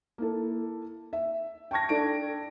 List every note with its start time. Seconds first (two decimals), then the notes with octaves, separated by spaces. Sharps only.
0.18 A#3 E4 A4
1.13 E5
1.71 G5 A5 C#6 G#6 A#6
1.89 D4 A4 D5 D7